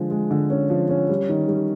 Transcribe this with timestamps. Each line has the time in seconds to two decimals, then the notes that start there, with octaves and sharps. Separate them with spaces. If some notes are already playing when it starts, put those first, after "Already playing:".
Already playing: D3 F3 G#3
0.11 G#3
0.31 D3
0.50 C#4
0.70 F3
0.89 C#4
1.09 G3
1.29 D#3
1.48 G3